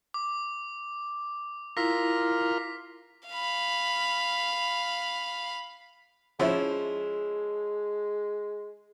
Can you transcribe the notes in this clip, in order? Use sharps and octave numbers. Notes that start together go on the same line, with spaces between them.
D6
E4 F4 A#4 A#6 B6
F5 B5
F3 G#3 C#4 E4